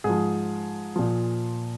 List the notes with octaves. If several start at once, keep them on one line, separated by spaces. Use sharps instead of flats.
G#2 G#4
F3
A#2 F3